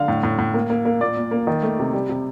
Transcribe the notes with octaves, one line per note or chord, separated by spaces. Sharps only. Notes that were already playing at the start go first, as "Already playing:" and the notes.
Already playing: D3 F5
A2
A2
A2
A#3
A#3
A#3
A#2 D5
A#2
A#3
D#3
A3
C3
G3
C3